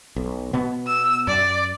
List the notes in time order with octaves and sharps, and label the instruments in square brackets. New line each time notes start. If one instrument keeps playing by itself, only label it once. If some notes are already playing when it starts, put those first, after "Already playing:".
[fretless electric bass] B1
B2 B3
[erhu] E6
[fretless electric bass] F#2 [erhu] D5